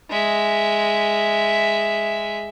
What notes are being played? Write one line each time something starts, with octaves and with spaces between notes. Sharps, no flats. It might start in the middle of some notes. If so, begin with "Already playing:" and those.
G#3 E5